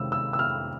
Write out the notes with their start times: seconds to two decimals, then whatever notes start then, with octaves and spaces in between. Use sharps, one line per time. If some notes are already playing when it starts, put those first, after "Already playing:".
Already playing: C3 D#3 G#3 C#4 E6
0.12 E6
0.33 E6
0.39 F6